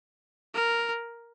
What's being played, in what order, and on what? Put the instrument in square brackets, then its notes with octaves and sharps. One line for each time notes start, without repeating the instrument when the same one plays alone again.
[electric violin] A#4